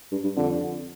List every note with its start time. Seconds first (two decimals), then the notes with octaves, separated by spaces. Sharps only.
0.12 G2
0.24 G2
0.37 F2 D3